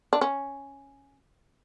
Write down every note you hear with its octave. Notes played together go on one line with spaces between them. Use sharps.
D4
C#4